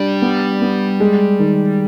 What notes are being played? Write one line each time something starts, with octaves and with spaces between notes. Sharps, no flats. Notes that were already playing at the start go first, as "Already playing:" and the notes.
Already playing: G3 D4
B3
B3
G#3
D#3